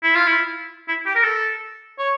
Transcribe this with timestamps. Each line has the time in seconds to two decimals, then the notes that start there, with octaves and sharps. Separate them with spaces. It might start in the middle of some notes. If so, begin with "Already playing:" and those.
0.03 E4
0.15 F4
0.27 E4
0.88 E4
1.06 G4
1.15 A#4
1.23 A4
1.99 C#5